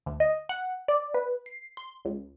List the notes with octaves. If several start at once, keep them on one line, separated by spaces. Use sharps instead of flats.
D2
D#5
F#5
D5
B4
C7
C6
C#2